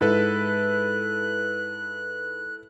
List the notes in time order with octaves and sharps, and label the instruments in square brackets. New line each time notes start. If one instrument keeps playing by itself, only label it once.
[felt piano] G#2 [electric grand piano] E4 A4 B4 [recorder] F#6